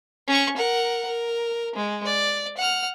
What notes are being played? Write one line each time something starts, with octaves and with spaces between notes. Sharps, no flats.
C#4 C#6
A#4 F#5
A#4
G#3
D5
F#5 F6